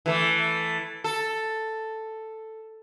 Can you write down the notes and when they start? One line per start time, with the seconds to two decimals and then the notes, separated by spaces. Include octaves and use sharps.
0.06 E3 A3
1.04 A4